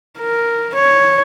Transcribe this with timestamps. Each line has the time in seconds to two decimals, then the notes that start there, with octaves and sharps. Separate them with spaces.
0.18 A#4
0.74 C#5